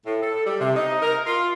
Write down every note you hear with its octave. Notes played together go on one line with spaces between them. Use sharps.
A2
A4
G3
C3
D#4
A#4
F4